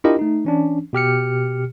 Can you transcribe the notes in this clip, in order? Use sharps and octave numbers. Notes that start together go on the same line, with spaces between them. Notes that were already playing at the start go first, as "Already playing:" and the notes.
D4 E4 F4 G4 A#4 D#5
A3 D#4
E3 C#4 D4
B2 G4 F6 C#7